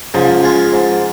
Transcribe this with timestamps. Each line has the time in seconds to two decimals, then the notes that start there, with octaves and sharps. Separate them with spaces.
0.14 G#2 C#3 F3
0.43 G#3 F4
0.73 G#2